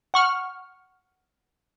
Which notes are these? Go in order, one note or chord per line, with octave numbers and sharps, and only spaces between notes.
F#5 C#6 F6